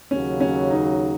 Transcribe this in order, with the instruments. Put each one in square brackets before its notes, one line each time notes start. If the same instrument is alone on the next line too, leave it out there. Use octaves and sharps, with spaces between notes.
[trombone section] D#2 C#3 F#3 [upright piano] C#4
[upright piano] C#4
D#4